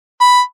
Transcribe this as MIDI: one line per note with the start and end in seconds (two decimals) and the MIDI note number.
0.21 0.41 83